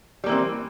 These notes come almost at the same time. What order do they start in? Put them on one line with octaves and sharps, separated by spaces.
G3 A#3 E3 C4